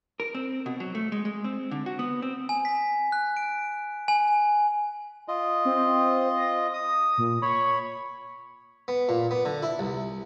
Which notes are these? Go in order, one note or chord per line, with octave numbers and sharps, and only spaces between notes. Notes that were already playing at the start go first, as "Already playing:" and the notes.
A#4
C4
B2
F#3
A3
G#3
G#3
C4
D3
F#4
B3
C4
G#5
B6
F#6
D7
G#5
F4 D#5
C4
A#6
D#6
A#2
C#5 B5 C#6
B3
A#2
B3
D3
E4
C2